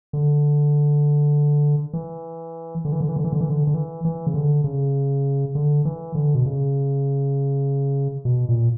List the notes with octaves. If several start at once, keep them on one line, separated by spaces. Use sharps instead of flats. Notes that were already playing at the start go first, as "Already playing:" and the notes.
D3
E3
D3
E3
D3
E3
D3
E3
D3
E3
D3
D3
E3
E3
C#3
D3
C#3
D3
E3
D3
B2
C#3
B2
A#2